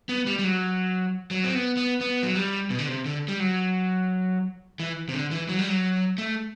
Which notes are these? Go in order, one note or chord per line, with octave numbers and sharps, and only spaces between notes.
B3
G3
G3
F#3
F#3
C4
B3
B3
B3
F#3
G3
B2
D3
C3
D3
G3
F#3
E3
C3
D3
E3
F#3
G3
F#3
A3